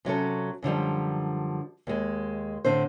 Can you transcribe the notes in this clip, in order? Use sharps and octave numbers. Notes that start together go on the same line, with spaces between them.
C3 F#3 C#4 A4
F#2 D3 F3 G3
D#2 G#3
A2 D3 C4 C5